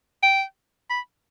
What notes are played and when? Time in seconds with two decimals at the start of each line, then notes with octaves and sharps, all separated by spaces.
0.23 G5
0.90 B5